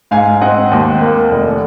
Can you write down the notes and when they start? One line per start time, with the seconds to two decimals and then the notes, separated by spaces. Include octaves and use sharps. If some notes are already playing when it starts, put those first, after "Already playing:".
0.11 G#2 F5 G#5
0.41 C4 D#5 F#5
0.71 D#2
1.01 A#3
1.31 F1